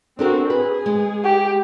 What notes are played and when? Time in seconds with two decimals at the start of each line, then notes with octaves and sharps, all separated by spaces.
0.19 C4 D4 F#4 A4 A#4
0.50 G#4 B4
0.86 G#3
1.24 G4